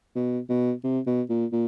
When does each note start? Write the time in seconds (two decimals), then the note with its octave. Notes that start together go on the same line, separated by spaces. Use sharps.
0.15 B2
0.49 B2
0.84 C3
1.06 B2
1.30 A#2
1.52 A#2